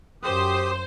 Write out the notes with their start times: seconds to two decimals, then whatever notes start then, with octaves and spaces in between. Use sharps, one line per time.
0.23 F#2 G4 C5 D#6